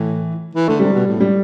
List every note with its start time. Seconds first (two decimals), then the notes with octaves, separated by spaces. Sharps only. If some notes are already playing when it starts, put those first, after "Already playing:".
Already playing: A2 E3
0.55 E3
0.68 D3 A3
0.80 C3 G3
0.94 B2
1.06 A2
1.20 G3